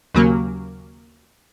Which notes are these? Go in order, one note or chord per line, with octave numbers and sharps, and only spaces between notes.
D#2 C#3 F#3 A#3